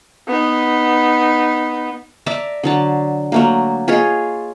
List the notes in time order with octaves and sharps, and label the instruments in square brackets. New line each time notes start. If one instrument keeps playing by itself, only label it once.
[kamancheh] B3 D#4
[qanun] D5 E5 A5 A#5
D3 F#3 A5
F#3 A3 A#3
F4 G#4 C#5 D#5